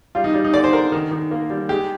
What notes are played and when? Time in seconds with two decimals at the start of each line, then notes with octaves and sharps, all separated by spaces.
0.15 G3 F4
0.24 D#4
0.34 G3
0.44 D#4
0.54 D3 D5
0.64 C5
0.73 D3 A#4
0.92 D#3
1.11 D#3
1.31 A#3
1.50 G3
1.69 G#3 G4